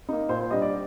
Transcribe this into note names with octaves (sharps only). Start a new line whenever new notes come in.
A#3 D#4
A#2 C5
C5
G3 D4 D#5
D5